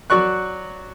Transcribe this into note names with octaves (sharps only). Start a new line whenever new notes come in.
F#3 F#4 D5 C#6 F#6